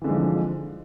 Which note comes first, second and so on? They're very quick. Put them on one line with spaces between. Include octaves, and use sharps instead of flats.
E3 D3 G#3 F3 D#4